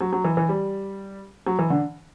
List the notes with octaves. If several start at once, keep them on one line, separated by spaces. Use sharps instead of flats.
F#3
F#3
E3
E3
G3
F#3
E3
D3